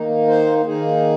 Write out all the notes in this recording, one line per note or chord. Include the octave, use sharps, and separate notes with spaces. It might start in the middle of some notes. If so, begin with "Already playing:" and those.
Already playing: D#3 A#3 D#4
C5
D#3 A#3 D#4 G#4